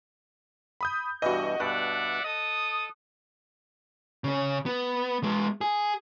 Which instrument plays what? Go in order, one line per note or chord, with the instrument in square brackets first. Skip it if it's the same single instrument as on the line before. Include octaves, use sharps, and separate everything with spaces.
[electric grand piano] B5 D#6 G6
[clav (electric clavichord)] G2 B2 E3 [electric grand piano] F#4 D#5
[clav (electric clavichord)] G2 B2 [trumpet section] D5 E5 F#5 [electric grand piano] F#6
[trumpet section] A4 D#6 [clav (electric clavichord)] D#5
[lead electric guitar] C#3 C#4
B3
G#3 B3
G#4